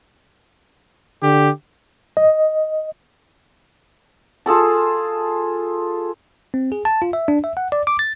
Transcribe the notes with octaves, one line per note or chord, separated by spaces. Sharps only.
D3 G4
D#5
F4 G#4 A4 A5
C4
G#4
A5
F4
E5
D4
E5
F#5
D5
D6
A6